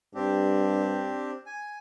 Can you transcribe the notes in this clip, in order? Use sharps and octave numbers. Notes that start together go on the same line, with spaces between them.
G2 C4 D4 G4
G#5